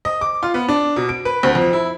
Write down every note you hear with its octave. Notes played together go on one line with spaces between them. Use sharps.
D#5
D6
F4
B3
D4
B2
D7
B4
D2
F2
E4